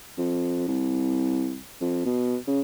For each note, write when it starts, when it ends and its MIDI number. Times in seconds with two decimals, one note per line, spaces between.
0.18 0.66 41
0.68 1.58 36
1.81 2.01 41
2.06 2.38 47
2.48 2.61 49